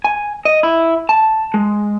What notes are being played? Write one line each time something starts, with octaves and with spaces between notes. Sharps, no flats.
G#5
D#5
E4
A5
G#3